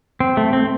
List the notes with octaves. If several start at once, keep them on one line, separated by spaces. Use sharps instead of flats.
C4
A3
C4